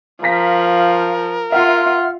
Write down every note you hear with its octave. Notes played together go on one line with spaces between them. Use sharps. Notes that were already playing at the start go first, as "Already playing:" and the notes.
F3 A#4 F5 A#5 A#6 B6
F4 E5 F#5 C6 F6